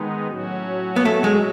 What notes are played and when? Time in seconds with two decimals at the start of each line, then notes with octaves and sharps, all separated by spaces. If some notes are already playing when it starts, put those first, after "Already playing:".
Already playing: D#3 G#3 B3 D#4
0.28 A2 F#3 C#4 F#4
0.96 B3
1.05 A3
1.24 G#3